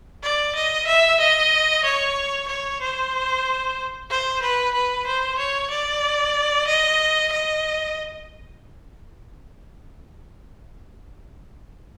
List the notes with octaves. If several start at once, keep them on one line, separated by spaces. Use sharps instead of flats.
D5
D#5
E5
D#5
C#5
C#5
C5
C5
B4
B4
C5
C#5
D5
D#5
D#5